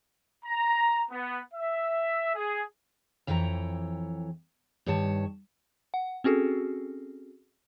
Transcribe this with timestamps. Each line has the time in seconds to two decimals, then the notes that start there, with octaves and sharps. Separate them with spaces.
0.45 A#5
1.11 B3
1.53 E5
2.35 G#4
3.27 F2 E3 C#5 G5 G#5 A#5
4.86 G2 D#3 C#5 A5
5.94 F#5
6.24 C4 C#4 F#4 G#4 A4